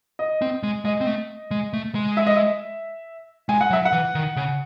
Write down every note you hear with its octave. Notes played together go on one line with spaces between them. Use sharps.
D#5
C4
G#3
G#3 D#5
C4
A3
G#3
A3
G#3
E5
D#5
E5
G#3 G#5
F#5
F#3
E5
F#5
E3
D#3
C#3